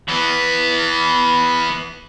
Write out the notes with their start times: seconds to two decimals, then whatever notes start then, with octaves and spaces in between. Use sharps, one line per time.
0.09 E3 B3